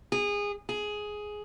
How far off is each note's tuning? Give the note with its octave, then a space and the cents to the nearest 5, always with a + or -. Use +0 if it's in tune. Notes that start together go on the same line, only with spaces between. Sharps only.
G#4 -20
G#4 +10